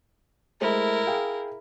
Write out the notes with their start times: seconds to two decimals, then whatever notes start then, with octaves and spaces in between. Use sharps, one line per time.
0.61 G#3 A3 E4 A#4 C5
1.07 G#4 F5 G5